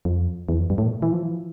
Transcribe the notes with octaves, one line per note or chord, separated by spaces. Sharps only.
F2
E2
F2
G2
A2
A#2
E3
F3
E3